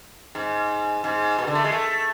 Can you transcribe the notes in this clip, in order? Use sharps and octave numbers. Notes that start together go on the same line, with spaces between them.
G#2
G#2
B2
D3
A3
G#3
A3